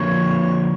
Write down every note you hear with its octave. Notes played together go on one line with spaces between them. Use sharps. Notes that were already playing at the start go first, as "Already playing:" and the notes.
Already playing: D3 F3 A#3 C#5